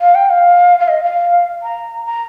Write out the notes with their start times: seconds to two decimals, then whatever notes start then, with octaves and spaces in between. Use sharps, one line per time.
0.01 F5
0.15 G5
0.30 F5
0.80 F5
0.88 D#5
1.03 F5
1.63 A#5
2.06 A#5